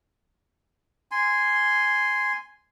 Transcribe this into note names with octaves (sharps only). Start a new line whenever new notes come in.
G#5 C6